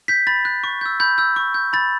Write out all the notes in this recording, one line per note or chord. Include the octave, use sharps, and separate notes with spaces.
G6 B6
B5 A6
F#6
C#6
E6 G6
B5 G6
E6 G6
C#6
G6
B5 A6